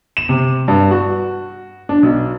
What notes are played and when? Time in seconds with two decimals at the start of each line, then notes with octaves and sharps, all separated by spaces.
0.17 E7
0.29 C3
0.68 G2
0.91 F#4
1.89 D4
2.03 B1